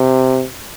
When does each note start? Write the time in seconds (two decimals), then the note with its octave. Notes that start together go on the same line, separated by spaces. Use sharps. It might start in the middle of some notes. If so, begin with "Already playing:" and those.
Already playing: C3